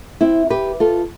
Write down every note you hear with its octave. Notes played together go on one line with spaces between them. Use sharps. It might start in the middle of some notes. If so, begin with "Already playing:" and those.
C4 E4
G4 B4
F4 A4